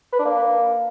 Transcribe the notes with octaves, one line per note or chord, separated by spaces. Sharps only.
B4
D4
A#3